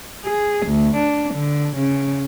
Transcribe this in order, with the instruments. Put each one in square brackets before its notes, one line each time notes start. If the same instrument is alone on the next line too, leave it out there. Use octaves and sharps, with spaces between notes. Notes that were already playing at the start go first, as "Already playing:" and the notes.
[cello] G#4
D2
D4
D3
C#3